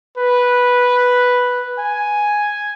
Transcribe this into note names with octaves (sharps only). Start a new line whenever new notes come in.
B4
G#5